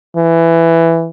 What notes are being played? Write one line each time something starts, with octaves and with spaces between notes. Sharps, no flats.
E3